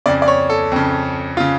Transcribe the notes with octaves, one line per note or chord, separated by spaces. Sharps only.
F2 C#3 D5
D5
C#5
A4
F2 C#3
C#3 F4